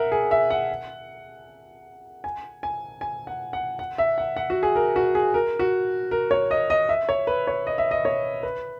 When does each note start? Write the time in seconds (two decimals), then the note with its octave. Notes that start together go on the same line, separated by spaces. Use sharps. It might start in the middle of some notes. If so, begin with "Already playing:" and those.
Already playing: A#4 E5 F#5
0.12 G#4
0.31 E5
0.50 F#5
2.24 G#5
2.63 G#5
3.01 G#5
3.27 F#5
3.53 F#5
3.79 F#5
3.98 E5
4.18 F#5
4.37 F#5
4.50 F#4
4.63 G#4
4.76 A#4
4.96 F#4
5.15 G#4
5.34 A#4
5.59 F#4
6.11 A#4
6.31 C#5
6.51 D#5
6.70 D#5
6.89 E5
7.09 C#5
7.27 B4
7.47 C#5
7.67 D#5
7.78 E5
7.91 D#5
8.05 C#5
8.43 B4